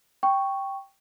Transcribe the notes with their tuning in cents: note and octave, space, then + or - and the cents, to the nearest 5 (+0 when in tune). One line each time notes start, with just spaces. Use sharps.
G5 +0 C#6 +0